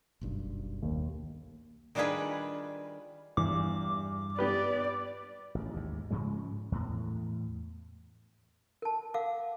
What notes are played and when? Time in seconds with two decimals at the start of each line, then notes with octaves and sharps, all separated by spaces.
0.21 F#1 B1 G2
0.82 D#2
1.95 D#3 G3 D4 F4 G#4 B4
3.37 E2 G2 G3 D6
4.39 B3 G4 B4 D5
5.55 A1
5.74 D#2 G#2
6.10 G#2 C#3 F3 G#3
6.72 E2 A2
8.82 A#4 A5
9.14 A#4 F5 F#5 D6